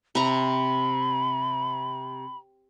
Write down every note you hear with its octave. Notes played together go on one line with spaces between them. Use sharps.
C3 A#5 B5